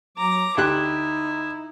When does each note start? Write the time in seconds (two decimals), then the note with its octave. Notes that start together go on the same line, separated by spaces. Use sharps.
0.17 F#3 A#5 D6
0.57 D2 D#4 E4 G4 F#6